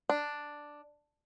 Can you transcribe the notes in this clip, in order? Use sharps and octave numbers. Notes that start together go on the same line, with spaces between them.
D4